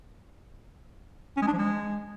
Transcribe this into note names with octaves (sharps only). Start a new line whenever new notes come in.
C#4
G#3
D4
F3
G#3